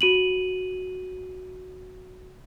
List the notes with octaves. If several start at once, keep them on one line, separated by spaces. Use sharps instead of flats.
F#4 D#7 F#7